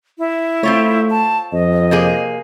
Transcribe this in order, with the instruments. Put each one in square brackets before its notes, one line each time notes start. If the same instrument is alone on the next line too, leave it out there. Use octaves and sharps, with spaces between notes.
[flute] E4
[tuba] A3 [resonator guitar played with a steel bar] C4 F4 C#5
[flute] A5
[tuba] F2 [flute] D#5
[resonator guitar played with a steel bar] C3 A#3 G#4